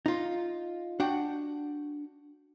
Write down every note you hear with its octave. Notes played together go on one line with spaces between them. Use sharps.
D#4 F4
D4 F#4 F#5 G5